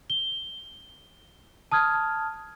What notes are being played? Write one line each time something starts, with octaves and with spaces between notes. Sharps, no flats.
G7
A5 D#6 F6 G#6